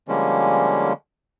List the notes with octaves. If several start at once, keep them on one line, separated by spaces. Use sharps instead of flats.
D3 F3 G3 G#3 A#3 C#4